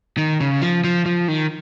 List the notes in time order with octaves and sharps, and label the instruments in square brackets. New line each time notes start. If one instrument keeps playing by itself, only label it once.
[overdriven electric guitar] D#3
C#3
F3
F3
F3
D#3